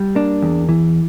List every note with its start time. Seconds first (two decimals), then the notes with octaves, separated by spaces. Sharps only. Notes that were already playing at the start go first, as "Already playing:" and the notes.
Already playing: G3
0.15 A#3 D4
0.42 E2
0.69 E3